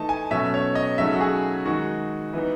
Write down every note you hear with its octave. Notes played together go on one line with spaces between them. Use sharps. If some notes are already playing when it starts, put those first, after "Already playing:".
Already playing: E3 A3 D#4 A5
G#5
B2 F#3 A3 C#4 E5
C#5
D#5
C#3 F#3 A3 D#4 E5
F#4
G#4
D#3 G#3 D#4 F#4
E3 B3 D#4